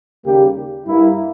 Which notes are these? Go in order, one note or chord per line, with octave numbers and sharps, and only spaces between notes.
D#2 C#3 G3 A#3 G4
G2 G3 A#3 E4